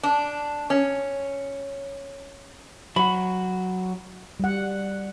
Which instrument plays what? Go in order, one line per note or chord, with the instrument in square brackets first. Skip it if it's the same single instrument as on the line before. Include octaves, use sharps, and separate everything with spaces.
[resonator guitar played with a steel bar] D4
C#4
[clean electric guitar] F#3 F#4 [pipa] B5
[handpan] G3 F#5